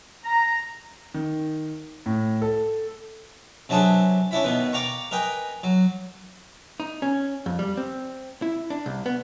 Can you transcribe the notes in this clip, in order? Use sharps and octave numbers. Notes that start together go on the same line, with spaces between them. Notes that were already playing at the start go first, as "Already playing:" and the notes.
A#5
D#3
A2
A4
C3 F#3 D4 G#4 A4 B4
C#4 D4 E4 B5
B2 D#3 B4
D5 F5 G5 A#5 C#6
A#4 B4 D#5 G5 G#5
F#3
D#4
C#4
F2
G3
C4
E4
D4
C2
B3